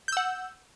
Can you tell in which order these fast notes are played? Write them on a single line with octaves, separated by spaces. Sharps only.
G6 E6 F#5